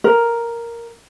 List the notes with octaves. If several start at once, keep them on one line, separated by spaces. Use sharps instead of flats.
A#4